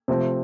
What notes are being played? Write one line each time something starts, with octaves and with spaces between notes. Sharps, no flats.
C3 F3 A3 C4